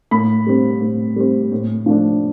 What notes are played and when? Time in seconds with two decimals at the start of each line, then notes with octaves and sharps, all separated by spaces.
0.11 A2 B5
0.47 G3 C4
0.81 A2
1.16 G3 C4
1.52 A2
1.86 F3 A3 D4